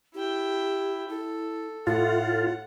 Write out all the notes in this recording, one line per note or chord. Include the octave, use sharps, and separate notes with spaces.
E4 G4 G5
E4 A4
A2 F4 A4 F#5